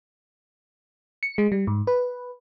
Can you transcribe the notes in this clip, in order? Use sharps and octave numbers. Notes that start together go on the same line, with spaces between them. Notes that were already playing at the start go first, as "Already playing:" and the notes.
C#7
G#3
G3
G#2
B4